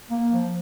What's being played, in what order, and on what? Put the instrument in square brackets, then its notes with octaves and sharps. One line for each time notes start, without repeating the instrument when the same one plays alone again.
[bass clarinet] A#3
F3